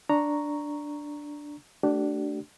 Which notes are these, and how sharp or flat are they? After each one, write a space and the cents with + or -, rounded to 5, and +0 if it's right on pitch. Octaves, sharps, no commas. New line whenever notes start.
D4 +0 A#5 +0 C#6 +0
A3 +0 D4 +0 G4 -45